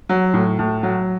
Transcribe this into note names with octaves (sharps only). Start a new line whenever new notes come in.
F#3
A2
A2
F#3